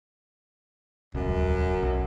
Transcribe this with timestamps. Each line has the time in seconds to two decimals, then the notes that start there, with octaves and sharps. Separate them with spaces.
1.15 D#1 C#2 F#2
1.83 B1